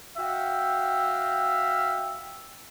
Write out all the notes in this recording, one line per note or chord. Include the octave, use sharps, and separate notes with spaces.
F#4 E5 F5 G5